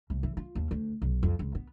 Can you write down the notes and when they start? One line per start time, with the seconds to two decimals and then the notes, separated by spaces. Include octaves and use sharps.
0.10 C2
0.23 E3
0.37 F4
0.55 D#2
0.71 D2
1.02 B1
1.23 F2
1.39 C#2
1.55 B3